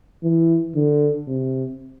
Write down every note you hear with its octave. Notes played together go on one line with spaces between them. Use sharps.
E3
D3
C3